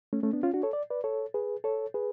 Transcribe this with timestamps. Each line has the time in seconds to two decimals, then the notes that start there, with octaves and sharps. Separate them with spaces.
0.13 A3 C#4
0.23 A3 C#4
0.33 B3 D4
0.43 C#4 F4
0.54 D4 F#4
0.63 A4 C#5
0.73 D5
0.90 B4 D5
1.04 A4 C#5
1.34 G#4 B4
1.64 A4 C#5
1.94 G#4 B4